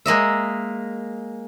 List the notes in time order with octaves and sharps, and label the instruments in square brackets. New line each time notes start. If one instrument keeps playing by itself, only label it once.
[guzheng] G#3 A#3 D#5 E5